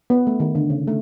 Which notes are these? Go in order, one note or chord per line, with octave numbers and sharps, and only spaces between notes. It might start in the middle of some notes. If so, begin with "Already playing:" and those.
B3
A3
D#3
D3
C#3
A3